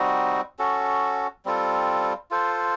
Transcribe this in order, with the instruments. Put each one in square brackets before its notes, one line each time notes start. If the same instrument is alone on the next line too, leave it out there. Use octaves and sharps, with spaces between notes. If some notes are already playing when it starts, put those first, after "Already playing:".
Already playing: [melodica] G3 C4 D#4 F#4
C#4 F#4 A4
G3 C4 F4 A4
F4 A4 C5